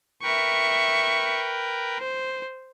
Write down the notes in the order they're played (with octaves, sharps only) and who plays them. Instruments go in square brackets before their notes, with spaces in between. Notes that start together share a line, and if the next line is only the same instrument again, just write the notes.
[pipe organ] A#4 B4 G5 [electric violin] E5 C#6
[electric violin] C5